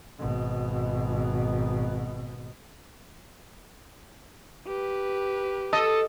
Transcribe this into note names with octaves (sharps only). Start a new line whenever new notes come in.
G#1 B2
G4 B4
A4 D#5